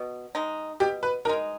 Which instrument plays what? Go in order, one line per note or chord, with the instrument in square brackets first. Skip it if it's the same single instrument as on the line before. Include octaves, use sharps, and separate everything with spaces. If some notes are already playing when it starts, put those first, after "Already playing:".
Already playing: [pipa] B2
G#3 D#4
[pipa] B2 [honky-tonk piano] G4
[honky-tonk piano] B4
[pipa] D#4 [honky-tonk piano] A#4
[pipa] G#3